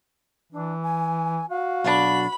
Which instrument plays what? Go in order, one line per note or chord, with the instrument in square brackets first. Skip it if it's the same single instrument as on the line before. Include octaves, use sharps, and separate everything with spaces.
[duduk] E3 [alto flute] D4
[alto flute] G#5
[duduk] F#4 [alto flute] F5
[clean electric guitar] B1 D4 [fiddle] B5